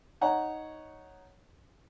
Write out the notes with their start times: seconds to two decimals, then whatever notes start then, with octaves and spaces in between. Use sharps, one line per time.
0.21 D#4 C#5 F#5 A#5